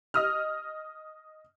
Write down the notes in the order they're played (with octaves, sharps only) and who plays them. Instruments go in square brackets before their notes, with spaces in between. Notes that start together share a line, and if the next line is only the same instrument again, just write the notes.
[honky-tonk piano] D#5 D#6 F6